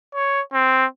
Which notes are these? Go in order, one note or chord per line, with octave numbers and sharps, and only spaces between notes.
C#5
C4